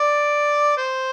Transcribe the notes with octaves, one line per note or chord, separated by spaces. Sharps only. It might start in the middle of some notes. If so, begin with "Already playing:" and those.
Already playing: D5
C5